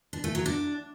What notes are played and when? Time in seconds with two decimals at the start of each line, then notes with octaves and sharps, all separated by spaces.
0.13 D4
0.24 A3
0.35 F#3
0.46 D4